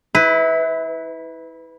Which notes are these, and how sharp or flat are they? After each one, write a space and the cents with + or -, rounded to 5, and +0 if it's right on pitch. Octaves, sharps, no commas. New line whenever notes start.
E4 -25 B4 +15